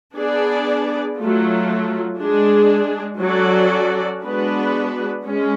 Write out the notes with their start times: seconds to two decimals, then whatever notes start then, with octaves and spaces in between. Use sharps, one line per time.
0.16 B3 D4 G#4 D5
1.18 F#3 A3 F4
2.20 G#3 D4 G#4
3.21 F#3 C#4 F#4 A4 D5
4.23 G#3 B3 D4 F#4 B4
5.25 G#3 C#4